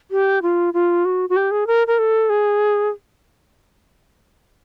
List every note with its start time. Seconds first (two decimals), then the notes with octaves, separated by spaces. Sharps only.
0.11 G4
0.42 F4
0.74 F4
1.05 F#4
1.29 F#4
1.36 G4
1.51 G#4
1.67 A#4
1.87 A#4
1.99 A4
2.29 G#4